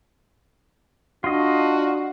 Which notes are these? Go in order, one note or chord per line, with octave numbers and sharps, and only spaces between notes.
D4 F4 F#4 D#5